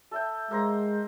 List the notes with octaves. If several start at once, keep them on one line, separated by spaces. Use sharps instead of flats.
A4 E5 G5
G#3 A#3 C5 A#5